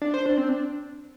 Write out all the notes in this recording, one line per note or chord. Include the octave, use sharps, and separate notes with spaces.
D4
C5
D4
C4
D4